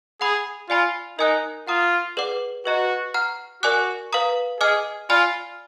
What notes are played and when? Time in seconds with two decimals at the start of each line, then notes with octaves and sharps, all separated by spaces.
0.21 G#4 F#5 B5 D#6
0.70 F4 D5 G#5 B5
1.19 D#4 A#4 D#5 G#5 D#6 F#6
1.67 F4 F#5 A#5 D#6
2.17 G#4 B4 D5 F#5 D6
2.65 F#4 B4 D#5 A#5
3.14 F#5 A#5 F6
3.63 F#4 A#4 D5 G#5 D6 F#6
4.13 B4 F5 A#5 D#6
4.60 G#4 D#5 G#5 D6 F6
5.10 F4 D5 G#5 B5 F6